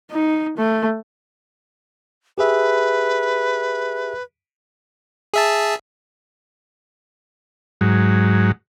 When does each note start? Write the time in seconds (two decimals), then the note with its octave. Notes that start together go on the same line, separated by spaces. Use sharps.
0.11 D#4
0.57 A3
2.38 G4 G#4 B4 E5
5.34 G#4 E5 A5
7.81 G#2 F#3